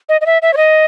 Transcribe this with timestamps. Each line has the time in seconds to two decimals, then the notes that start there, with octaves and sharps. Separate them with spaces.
0.09 D#5
0.21 D#5
0.26 E5
0.42 E5
0.53 C#5
0.57 D#5